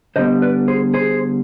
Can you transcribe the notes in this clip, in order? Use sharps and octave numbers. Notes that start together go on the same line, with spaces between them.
D3 G3 B3 C5 D#5
B4 D5
G#4 C5
G#4 C5